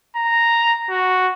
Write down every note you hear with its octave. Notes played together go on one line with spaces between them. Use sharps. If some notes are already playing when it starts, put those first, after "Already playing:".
A#5
F#4